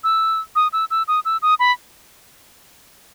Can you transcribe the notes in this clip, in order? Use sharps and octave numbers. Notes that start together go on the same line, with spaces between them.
E6
D#6
E6
E6
D#6
E6
D#6
B5